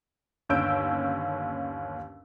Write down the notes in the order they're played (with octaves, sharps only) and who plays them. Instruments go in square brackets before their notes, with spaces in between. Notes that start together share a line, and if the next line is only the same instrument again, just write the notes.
[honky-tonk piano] G1 D#2 C#4 E6 G6 D7